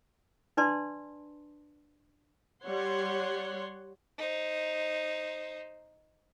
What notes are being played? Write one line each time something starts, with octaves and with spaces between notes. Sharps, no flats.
D4 B4 D5 A5 C6
G3 C#5 F#5 C6
D#4 C5